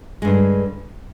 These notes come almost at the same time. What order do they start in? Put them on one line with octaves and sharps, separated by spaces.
G#3 G2 D3